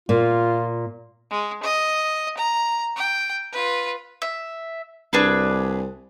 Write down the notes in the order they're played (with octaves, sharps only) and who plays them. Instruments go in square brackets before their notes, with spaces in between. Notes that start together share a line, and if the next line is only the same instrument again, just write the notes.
[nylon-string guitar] A#2 [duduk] F4
[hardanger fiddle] G#3
D#5
A#5
G5
F4 B4
[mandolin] E5
[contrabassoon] C2 [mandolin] D4 G#4 B4